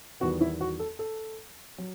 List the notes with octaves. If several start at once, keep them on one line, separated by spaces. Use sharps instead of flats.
E2 D#3 G3 B3 F#4
E4
F#4
A4
A4
F#3